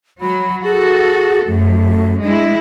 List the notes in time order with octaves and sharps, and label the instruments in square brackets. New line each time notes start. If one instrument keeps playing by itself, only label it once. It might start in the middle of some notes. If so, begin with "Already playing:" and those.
[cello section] F#3 [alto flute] B5
[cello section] F#4 A4 [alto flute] G#4
[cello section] F#2 [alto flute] A3
[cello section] G#3 E4 [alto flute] D4